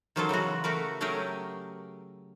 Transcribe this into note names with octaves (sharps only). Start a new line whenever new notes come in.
D#3 F3 F#3 C#4 F4 A4
C#3 E3 G#3 F#4
A3 F#4 A#4 B4
F#3 A3 C#4 G4 G#4 A#4